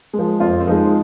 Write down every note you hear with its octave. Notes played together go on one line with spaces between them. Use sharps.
G#3
F3
F2 C4 F4
C4
F3 G#3 D#4